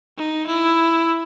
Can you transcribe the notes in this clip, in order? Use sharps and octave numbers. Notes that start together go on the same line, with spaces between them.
D#4
E4